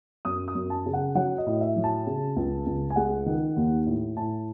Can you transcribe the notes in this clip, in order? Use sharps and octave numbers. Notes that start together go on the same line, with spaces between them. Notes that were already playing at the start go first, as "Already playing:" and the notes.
F#2 D#6
D#6
F#2
A5
C#3
F#5
F#3 F#5
D#5
A2
E5
F#3
A5
C#3
C#2
C#2
G#5
G#3 F#5
D#3
D#2
A2
A2 A5